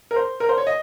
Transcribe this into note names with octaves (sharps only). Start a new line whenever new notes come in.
A#4
C5
A#4
C5
C#5
D#5